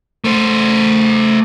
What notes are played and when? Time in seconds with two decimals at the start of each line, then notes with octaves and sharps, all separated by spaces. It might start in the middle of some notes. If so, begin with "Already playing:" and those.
0.24 A3 C5